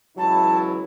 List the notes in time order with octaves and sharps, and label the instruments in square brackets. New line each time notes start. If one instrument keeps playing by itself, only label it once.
[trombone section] C#2 E3 E4 [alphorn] F#3 [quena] A5